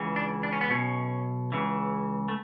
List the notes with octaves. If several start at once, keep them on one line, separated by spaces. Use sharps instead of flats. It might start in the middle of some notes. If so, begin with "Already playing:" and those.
Already playing: C#2 C#3 E3
D4
D4
C#4
B3
B1 B2 C#4
C#2 C#3 E3
A3